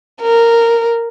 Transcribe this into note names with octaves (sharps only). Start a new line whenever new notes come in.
A#4